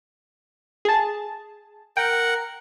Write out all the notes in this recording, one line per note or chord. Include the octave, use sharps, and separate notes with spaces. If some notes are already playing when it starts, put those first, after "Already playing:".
G#4 A5
A#4 F#5 G5